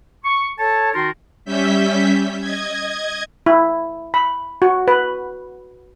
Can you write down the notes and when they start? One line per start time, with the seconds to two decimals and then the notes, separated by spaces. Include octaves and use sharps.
0.24 C#6
0.59 A4 C#5 A5
0.94 D#3 D#4 F#4 A#4 A5 C6
1.45 G3 C#4 E5 G6 B6
2.39 D#5 G#6
3.46 E4
4.14 B5
4.62 F#4
4.88 B4